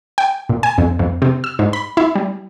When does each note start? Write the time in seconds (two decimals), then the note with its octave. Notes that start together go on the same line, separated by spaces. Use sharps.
0.18 G5
0.49 A#2
0.63 G#5
0.78 F2
0.99 F2
1.22 C3
1.44 E6
1.59 G#2
1.73 B5
1.97 E4
2.15 G3